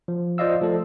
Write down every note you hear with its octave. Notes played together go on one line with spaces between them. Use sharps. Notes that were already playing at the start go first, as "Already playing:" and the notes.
F3
F4 C5 D5 D#5 F5 E6
F3 A3 A4